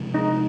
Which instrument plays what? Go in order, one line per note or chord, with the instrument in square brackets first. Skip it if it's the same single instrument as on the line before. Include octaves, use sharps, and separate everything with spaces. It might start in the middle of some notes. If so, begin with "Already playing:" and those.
Already playing: [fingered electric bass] C3 F3 G#3
[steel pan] D#4